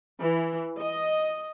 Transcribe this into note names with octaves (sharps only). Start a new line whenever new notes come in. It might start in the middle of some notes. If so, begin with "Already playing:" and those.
E3
D#5